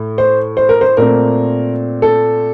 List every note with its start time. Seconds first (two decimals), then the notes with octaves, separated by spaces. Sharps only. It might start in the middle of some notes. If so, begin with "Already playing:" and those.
Already playing: A2
0.18 C5
0.57 C5
0.69 A#4
0.81 C5
0.97 A#2 A3 C4 A#4
2.02 A4